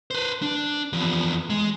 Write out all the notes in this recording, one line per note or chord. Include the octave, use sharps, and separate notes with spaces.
B4 C5
D4
E2 F3
G#3